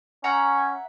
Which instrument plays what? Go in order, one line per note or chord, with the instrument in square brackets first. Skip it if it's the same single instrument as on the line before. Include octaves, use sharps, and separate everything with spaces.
[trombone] C#4 [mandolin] E5 F#5 A#5